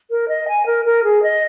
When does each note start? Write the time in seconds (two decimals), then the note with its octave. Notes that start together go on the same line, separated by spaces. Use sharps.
0.11 A#4
0.28 D#5
0.48 G#5
0.66 A#4
0.85 A#4
1.04 G#4
1.23 D#5